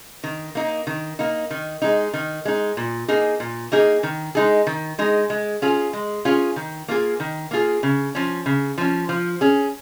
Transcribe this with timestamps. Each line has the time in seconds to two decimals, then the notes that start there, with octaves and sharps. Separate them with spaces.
0.24 D#3
0.55 A#3 D#4
0.87 D#3
1.19 A#3 D#4
1.50 D#3
1.82 G#3 D#4
2.14 D#3
2.45 G#3 D#4
2.77 A#2
3.08 A#3 D#4 G#4
3.40 A#2
3.72 A#3 D#4 G#4
4.03 D#3
4.35 G#3 D#4 G#4
4.67 D#3
4.99 G#3 D#4 G#4
5.30 G#3
5.62 C#4 F4 G#4
5.93 G#3
6.25 C#4 F4 G#4
6.56 D#3
6.88 A#3 F4 G#4
7.20 D#3
7.51 A#3 F4 G#4
7.83 C#3
8.15 F3 C#4
8.46 C#3
8.78 F3 C#4
9.09 F3
9.41 C#4 G#4